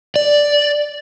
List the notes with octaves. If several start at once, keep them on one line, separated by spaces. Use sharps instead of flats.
D5